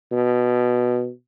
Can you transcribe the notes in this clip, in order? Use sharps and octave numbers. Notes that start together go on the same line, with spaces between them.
B2